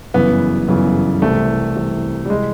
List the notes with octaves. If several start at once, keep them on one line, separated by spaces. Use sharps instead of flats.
G1 F#2 C#3 E3 B3
G1 F#2 C#3 E3
C2 C3 E3 A3
C2 C3 E3
G3
C3 E3 G#3